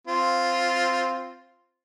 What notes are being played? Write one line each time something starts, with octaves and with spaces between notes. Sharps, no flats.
C4 F4